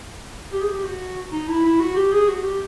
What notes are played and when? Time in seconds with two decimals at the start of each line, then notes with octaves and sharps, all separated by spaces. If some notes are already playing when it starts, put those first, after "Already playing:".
0.53 G4
0.61 G#4
0.71 G4
0.84 F#4
1.32 D#4
1.48 E4
1.64 E4
1.80 F#4
1.96 G4
2.12 G#4
2.28 F#4
2.43 G4